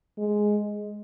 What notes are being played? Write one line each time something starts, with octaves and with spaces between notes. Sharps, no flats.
G#3